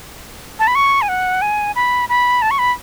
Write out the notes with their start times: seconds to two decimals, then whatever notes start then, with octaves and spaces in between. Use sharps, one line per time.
0.59 A5
0.67 B5
0.75 C#6
1.02 G#5
1.09 F#5
1.42 G#5
1.75 B5
2.09 B5
2.42 A5
2.51 C#6
2.59 B5